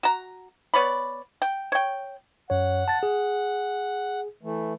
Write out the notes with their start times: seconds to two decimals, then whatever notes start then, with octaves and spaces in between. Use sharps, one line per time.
0.03 F#4 A#5
0.74 B3 C#5 D5 B5
1.42 G5
1.72 C#5 G5
2.50 F#2 C#5 F#5
2.88 A5 A6
3.03 G#4
4.43 E3 A3